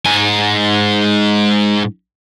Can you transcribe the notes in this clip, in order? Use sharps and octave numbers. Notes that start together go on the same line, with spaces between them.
G#2 G#5